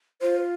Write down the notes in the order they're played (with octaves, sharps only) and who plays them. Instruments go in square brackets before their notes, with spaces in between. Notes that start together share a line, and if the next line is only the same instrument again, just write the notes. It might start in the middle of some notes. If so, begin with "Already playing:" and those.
[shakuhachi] F4 [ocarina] C5